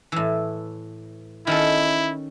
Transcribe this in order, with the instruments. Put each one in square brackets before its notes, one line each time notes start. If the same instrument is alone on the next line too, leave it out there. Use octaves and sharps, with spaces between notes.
[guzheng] A2 E3
[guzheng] D#3 C#4 A4 [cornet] E4